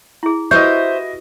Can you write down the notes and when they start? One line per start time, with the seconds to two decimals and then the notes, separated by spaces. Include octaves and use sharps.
0.23 E4 G#4
0.51 E4 F#4 G4 B4 C5 D#5 E5 G6